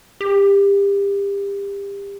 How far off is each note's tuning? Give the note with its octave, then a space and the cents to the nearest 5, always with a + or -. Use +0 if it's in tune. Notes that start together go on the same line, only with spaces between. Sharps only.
G4 +30